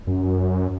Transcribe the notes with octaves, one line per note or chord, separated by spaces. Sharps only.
F#2